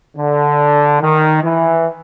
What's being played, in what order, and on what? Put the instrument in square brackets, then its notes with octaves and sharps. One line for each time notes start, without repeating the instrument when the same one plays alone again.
[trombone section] D3
D#3
E3